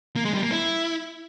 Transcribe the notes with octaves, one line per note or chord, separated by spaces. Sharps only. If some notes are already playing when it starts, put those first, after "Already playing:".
A#3
G#3
G3
A#3
E4